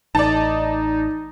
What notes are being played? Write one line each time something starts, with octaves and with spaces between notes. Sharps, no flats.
A1 D#4 D5 A5